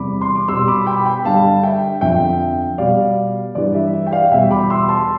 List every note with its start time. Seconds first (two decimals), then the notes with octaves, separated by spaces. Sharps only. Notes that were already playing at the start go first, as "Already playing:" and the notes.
Already playing: E2 C3 G3 B5 D6
0.21 C6
0.35 D6
0.48 B2 G3 C6 E6
0.68 B5 D6
0.81 C6
0.86 G5 B5
1.05 G5 B5
1.24 G2 D3 G3 F5 A5
1.63 E5 G5
2.01 F2 D3 F3 E5 G5
2.78 B2 G3 D5 F5
3.55 G2 E3 G3 D5
3.74 E5
3.93 E5
4.07 G5
4.12 D5 F5
4.31 E2 B2 G3 E5 G5
4.51 B5 D6
4.70 C6 E6
4.89 A5 C6